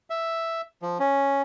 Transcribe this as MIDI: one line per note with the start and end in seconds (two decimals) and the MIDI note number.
0.10 0.61 76
0.82 0.98 53
1.00 1.42 61